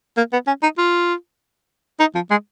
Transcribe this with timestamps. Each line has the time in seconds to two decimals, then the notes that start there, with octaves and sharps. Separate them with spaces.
0.17 A#3
0.33 B3
0.47 C#4
0.63 D#4
0.77 F4
2.00 D#4
2.15 F3
2.30 G#3